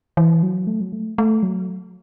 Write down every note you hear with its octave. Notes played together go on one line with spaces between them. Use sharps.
E3
F#3
A3
F#3
A3
A3
F#3